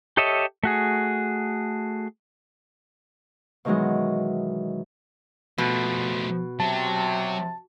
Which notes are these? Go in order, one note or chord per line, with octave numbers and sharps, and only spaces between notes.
G4 A4 C#5 D#5 E5
A3 F#4 G#4
B2 D#3 E3 F#3 G#3
B2 F3 A3
C3 F#3 A5